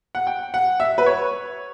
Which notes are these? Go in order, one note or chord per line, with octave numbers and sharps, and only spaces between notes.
F#5
G5
F#5
E5
B4
C#5